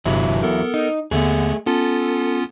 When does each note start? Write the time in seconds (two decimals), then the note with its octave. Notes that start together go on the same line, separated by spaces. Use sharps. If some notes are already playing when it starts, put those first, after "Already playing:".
0.05 G1 E2 G2 C3 F#3 E4
0.43 B3 A4 A#4
0.74 D#4
1.11 D#2 D3 A3 B3 G#4
1.67 B3 C#4 F4 A4